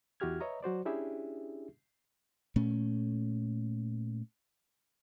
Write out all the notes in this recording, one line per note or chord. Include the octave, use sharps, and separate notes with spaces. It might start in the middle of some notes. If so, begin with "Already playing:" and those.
E2 E4 F#4 G4 F6 G#6
B4 C#5 D#5 E5 A#5
F#3 F#4 C5 D5
C#4 D4 E4 G4 G#4 E5
A#2 A3 C#4